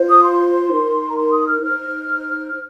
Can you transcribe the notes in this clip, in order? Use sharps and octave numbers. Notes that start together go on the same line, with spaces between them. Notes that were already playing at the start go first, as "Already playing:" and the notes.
Already playing: F4 C5
D#6
C6
D#4 A#4
A#5
C6
D#6
F6
D#4 C5 F6